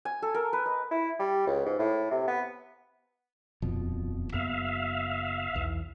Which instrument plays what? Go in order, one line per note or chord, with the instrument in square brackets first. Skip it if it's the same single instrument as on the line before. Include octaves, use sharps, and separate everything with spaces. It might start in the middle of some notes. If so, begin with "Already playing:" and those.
[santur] G#5
A4
A#4
B4
D#5
[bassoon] E4
G3
C#2
G#2
A2
C3
B3
[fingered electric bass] D#1 B2 F3 [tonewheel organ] F2
[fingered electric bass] F#1 F#2 B3 [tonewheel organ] E5 F5
[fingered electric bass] B1 E2 E3